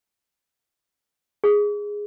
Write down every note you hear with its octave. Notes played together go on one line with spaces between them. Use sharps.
G#4